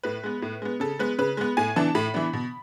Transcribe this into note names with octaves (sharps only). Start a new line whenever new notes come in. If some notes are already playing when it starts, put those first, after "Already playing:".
A2 B4
G#3 B3
A2
G#3 B3
C#3 A4
G#3 B3 B4
C#3 B4
G#3 B3
A2 G#5
E3 B3 D4 A5
A2 B5
E3 B3 D4
B2